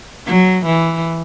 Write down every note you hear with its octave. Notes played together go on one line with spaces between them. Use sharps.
F#3
E3